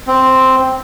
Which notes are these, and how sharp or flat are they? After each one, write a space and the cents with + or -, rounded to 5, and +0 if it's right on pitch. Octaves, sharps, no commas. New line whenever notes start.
C4 +0